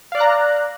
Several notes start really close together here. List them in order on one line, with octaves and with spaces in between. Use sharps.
F5 D5 F#6 A#5